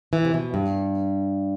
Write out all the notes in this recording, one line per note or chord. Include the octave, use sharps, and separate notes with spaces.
E3
C3
B2
G2